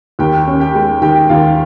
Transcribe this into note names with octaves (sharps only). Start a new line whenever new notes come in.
D#2 G4 G5
C#4
G4 G5
G#3
D#3 G4 G5
D#2 F4 F5